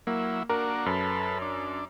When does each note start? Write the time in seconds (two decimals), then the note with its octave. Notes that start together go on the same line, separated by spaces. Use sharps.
0.07 F#3 A#3 E4
0.49 A#3 D4 F#4 A#4
0.86 F#2 A4 B4
1.42 D4